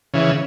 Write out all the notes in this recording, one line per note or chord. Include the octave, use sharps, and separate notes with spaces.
C#3 E3